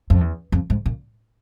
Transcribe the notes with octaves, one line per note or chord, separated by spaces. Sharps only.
F2
E2
F2
G#2
A#2